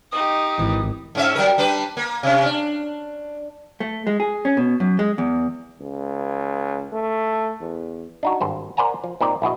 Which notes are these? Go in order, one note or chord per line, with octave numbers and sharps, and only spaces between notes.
D#4 G4 D#6
G#1 E3
G#2 C#4 E5
F#3 A#4
G3 D4 B4
A#3
C3 C#4
D4
A3
G#3
G#4
C#4
B2
F#2
G#3
E2
C#2
A3
E2
D4 D#4 F#4
G#1 G2 C5
A#4 C5 D5 F#5 G#5 A#5
F3
A#2 C4 D#4 D5
A#1 E4 F#4 D#5